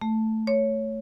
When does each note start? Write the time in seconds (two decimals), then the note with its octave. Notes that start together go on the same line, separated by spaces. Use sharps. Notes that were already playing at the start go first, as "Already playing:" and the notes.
0.02 A3
0.47 C#5